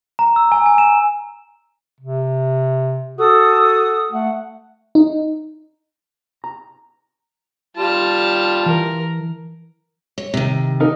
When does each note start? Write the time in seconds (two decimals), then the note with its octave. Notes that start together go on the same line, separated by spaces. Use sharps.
0.19 A#5
0.36 E6
0.52 G#5
0.66 G#5
0.78 E7
2.00 C3
3.18 F#4 A4 D#6
4.12 A3 F#5
4.95 D#4
6.44 A#5
7.77 G3 F4 A5
8.66 E3 A#4
10.18 C#5
10.34 C3 D#3
10.80 D#4 A#4